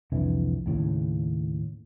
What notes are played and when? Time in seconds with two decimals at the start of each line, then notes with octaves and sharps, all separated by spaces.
0.12 C2 F2 D3 E3
0.66 D#2 A2 C#3